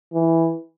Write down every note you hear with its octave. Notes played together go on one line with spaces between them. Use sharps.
E3